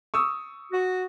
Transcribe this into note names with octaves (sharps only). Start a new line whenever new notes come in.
C#6 D#6 E6
F#4